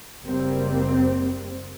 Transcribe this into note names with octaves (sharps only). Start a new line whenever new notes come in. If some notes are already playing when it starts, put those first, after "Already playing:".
F#1 G3 A#3 C4